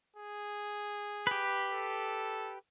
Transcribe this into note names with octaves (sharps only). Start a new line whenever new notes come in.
G#4
G4 B4
A4